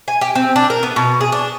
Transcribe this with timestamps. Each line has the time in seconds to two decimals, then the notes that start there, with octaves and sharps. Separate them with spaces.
0.08 G#5
0.21 G4
0.35 C4
0.56 D4
0.70 A#4
0.83 B3
0.96 B2
1.21 G#4
1.32 D4